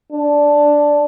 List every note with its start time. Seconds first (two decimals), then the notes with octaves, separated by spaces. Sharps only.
0.12 D4